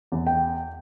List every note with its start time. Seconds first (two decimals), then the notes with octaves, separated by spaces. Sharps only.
0.12 E2
0.27 G5